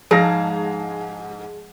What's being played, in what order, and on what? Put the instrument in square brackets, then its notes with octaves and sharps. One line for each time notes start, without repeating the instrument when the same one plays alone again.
[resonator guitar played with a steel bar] G#2 [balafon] F3 [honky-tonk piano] G#3 G#4 A5 [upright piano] F5 A#6